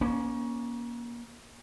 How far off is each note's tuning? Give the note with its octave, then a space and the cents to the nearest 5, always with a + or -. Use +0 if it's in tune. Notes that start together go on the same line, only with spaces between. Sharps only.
A#3 +30 C#4 +5